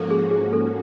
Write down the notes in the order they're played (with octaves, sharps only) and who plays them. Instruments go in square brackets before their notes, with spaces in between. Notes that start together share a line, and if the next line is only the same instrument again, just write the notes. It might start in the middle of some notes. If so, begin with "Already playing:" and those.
Already playing: [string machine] G#2 F3 A#3 C#4 F#4 [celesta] A4 A#4
[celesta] G#4
G#4
A4